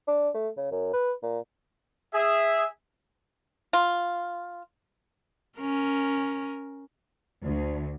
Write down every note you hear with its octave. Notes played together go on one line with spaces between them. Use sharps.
D4
A3
C#3
F#2
B4
A#2
G#4 E5
F4
C#4 A#4
D2